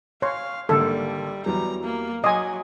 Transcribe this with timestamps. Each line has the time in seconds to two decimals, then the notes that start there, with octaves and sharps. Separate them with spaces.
0.22 C#5 F5 C6
0.69 G#1 D3 G3 A#3 A4
1.46 E2 F#3 G3 A#5
1.84 A#3
2.24 F#3 D#5 G#5 C6 D6